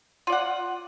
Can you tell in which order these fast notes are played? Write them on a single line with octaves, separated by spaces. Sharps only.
F4 D5 F#5